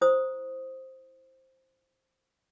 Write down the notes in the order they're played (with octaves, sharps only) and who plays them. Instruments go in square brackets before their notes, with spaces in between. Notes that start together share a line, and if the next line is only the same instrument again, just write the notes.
[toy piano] E4 C5 D#6